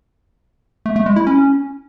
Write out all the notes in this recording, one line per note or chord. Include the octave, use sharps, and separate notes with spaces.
A3
A3
G#3
E4
C#4